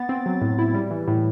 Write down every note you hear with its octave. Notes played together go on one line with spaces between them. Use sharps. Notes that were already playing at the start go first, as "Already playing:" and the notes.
Already playing: B3 A6
C4
F#3
A2
E4
G3
E3
A2